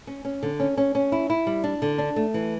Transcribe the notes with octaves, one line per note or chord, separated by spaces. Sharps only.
C#4
C#4
D3
C#4
C#4
C#4
E4
E4
G3
D4
D3
D4
A3
E3